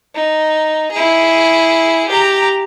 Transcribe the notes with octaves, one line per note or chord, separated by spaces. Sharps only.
D#4
E4 G#4
G4 A#5